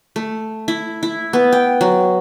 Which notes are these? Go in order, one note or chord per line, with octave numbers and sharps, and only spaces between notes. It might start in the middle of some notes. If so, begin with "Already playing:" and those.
A3
E4
E4
B3
G5
F#3